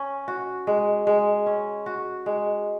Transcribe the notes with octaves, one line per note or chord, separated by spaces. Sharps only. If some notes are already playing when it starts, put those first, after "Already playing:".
Already playing: C#4
F#4
G#3
G#3
C#4
F#4
G#3